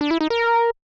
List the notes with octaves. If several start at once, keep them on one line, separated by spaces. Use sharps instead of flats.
D4
E4
D#4
A#4